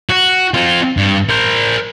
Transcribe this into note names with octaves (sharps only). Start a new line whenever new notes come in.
F#4
C4 F4
G2
A#4 C5